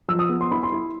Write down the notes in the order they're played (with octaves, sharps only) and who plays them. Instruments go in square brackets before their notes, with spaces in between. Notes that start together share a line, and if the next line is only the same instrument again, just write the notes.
[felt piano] F3 [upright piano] E6
[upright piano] D#6
[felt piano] B3
[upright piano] C6
[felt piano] E4 [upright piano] B5
[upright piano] C6
[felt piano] E4